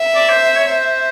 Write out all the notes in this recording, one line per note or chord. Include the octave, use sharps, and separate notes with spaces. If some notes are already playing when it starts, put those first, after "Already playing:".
Already playing: E5
D5
C5
C5
C#5
C5